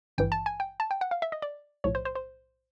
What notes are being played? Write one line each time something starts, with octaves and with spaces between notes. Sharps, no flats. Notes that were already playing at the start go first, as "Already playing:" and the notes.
G#1 G2 E3 G5
A5
G#5
G5
A5
G5
F#5
F5
E5
D#5
D5
B1 A2 F3 C#5
C5
C5
C5